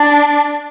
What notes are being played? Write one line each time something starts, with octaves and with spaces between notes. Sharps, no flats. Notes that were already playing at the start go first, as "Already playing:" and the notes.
Already playing: D4